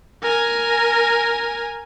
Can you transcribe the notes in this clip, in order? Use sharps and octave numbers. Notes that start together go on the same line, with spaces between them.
A#4 G#5